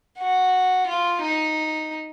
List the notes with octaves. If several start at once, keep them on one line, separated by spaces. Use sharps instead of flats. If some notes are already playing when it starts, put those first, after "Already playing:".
F#4
F4
D#4